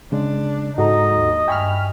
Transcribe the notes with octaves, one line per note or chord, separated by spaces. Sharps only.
C#3 G#3 D4
G#2 D#4 F#4 A4 D#5 A#5
D#2
G2 E5 G5 G#5 B5 C#6 F6